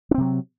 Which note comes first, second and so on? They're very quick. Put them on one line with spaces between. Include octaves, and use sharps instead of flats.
D4 C4 C3 F#3